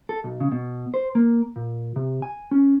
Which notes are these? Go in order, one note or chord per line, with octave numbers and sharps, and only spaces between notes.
A4
B1
C#3
B2
C5
A#3
A#2
C3
G#5
C#4